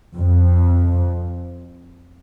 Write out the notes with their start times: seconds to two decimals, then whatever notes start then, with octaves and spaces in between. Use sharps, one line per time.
0.16 F2